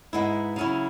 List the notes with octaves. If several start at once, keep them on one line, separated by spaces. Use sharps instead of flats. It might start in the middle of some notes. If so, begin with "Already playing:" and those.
G#2 G#3 B3 E4
C#3 F#3 C#4 E4